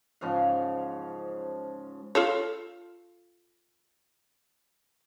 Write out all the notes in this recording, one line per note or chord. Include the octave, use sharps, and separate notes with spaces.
G#2 C#3 F3 F5
F4 A4 C#5